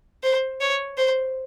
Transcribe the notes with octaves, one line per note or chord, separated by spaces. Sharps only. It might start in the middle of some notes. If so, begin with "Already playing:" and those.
C5
C#5
C5